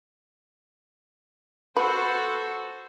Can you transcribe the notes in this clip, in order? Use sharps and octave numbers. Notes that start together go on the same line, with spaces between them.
F#4 A4 B4 C5